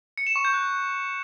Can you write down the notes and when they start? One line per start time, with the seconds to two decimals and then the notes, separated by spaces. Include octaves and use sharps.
0.18 C#7
0.27 E7
0.36 C#6
0.45 G6
0.54 F#6